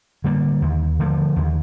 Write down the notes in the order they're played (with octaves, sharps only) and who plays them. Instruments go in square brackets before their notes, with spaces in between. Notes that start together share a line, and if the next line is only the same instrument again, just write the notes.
[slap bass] D3 G3 A#3
D#2
D3 F3 A3
D#2